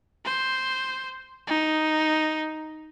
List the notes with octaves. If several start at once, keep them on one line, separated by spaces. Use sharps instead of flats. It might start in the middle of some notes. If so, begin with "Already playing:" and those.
C5
D#4